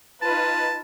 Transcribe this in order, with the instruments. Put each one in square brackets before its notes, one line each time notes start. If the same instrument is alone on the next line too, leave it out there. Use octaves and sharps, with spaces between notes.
[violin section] D#4 F4 B4 [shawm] A5